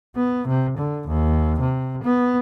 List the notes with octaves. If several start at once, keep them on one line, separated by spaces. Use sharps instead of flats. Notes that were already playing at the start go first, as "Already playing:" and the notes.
B3
C3
D3
D#2
C3
B3